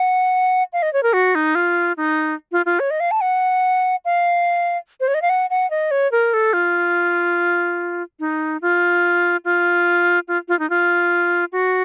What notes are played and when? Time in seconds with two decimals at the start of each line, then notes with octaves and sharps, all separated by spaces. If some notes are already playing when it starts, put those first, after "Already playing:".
Already playing: F#5
0.73 F5
0.82 D#5
0.93 C#5
1.03 A#4
1.13 F#4
1.35 D#4
1.55 F4
1.97 D#4
2.52 F4
2.66 F4
2.80 C#5
2.91 D#5
3.00 F5
3.11 A5
3.21 F#5
4.05 F5
5.00 C5
5.08 C#5
5.14 D#5
5.22 F5
5.30 F#5
5.50 F#5
5.71 D#5
5.91 C#5
6.12 A#4
6.34 A4
6.53 F4
8.20 D#4
8.62 F4
9.45 F4
10.28 F4
10.48 F4
10.59 D#4
10.70 F4
11.52 F#4